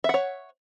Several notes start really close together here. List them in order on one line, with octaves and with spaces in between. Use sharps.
E5 F#5 C#5